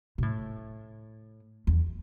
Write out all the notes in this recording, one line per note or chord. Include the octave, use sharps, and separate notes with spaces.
B2
A2
E2